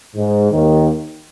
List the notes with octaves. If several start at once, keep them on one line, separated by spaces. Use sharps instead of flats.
G#2
D#2 D#3